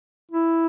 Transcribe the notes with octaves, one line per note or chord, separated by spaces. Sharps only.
E4